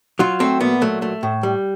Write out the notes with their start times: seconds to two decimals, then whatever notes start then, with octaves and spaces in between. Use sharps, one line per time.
0.19 F#3 F4
0.40 A3 C4
0.61 A#2 B3
0.82 F#3 A3
1.02 A3
1.23 A2
1.43 G3